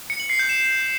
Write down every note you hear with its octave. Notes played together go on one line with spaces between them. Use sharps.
C#7
F#7
C7
G6
E7